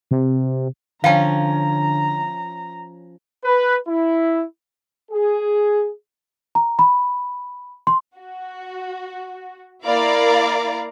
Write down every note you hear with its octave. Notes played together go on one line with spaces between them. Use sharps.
C3
D3 F3 C#4 F5 G5 A5 A#5
B4
E4
G#4
A#5
B5
C6
F#4
A#3 E4 A#4 D5 F5 A#5